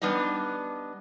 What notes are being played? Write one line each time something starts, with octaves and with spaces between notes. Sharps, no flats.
G3 B3 D4 D#4 D#5